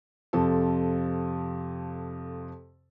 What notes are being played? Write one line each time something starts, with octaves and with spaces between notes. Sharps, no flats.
F2 C3 F3 A4